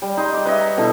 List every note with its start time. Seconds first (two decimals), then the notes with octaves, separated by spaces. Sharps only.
0.02 G3
0.17 D#4 D#5 C6
0.33 D5 D6
0.45 B4 C#5 D#5 E5
0.60 A#5
0.77 B2 D3 E4 A4